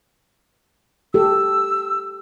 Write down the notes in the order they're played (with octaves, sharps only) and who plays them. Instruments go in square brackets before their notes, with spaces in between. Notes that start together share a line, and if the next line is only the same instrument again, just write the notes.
[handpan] G4 A4 [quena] E6